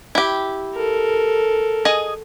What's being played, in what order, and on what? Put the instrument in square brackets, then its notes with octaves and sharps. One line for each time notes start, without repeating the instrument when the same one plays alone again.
[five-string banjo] E4 G4
[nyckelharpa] A4 A#4
[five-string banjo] G#4 D#5